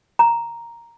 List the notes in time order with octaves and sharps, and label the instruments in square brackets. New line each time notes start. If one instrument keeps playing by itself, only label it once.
[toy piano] A#5